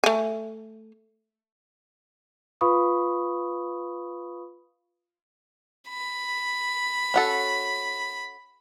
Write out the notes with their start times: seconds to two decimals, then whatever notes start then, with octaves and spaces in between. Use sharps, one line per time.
0.04 A3 G#5
2.61 F4 B4 F5 B5 C#6 D#6
5.89 B5
7.14 C#4 F#4 A4